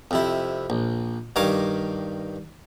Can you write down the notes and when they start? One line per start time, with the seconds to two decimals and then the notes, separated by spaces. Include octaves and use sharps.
0.11 F2 C3 E4
0.70 A#1
1.36 G2 D#3 C#5 F5 A#5 D6